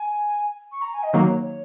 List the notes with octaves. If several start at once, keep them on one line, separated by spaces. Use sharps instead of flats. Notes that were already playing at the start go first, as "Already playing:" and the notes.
Already playing: G#5
C#6
A#5
G#5
D#5
D#3 F#3 A#3 C#5
C#5
C#5